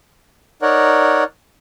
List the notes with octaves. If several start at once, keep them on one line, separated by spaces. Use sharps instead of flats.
D#4 A#4 C#5 D5 F#5